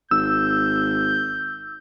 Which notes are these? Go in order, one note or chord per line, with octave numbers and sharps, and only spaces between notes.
G#1 E6 G6